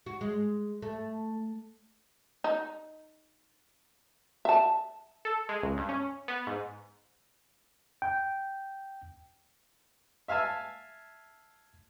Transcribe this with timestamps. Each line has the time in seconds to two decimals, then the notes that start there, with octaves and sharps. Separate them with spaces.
0.06 F#4
0.21 G#3
0.82 A3
2.44 D#4
4.45 E5 A5
5.25 A4
5.49 G#3
5.63 C#2
5.77 G2
5.89 C#4
6.28 B3
6.47 G#2
8.02 G5
10.28 E5 F5 G#5 A5 E6